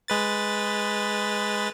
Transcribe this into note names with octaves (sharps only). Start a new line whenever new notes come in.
G#3 B4 A6